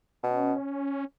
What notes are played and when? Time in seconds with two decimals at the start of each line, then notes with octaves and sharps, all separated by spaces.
0.23 B2 C#4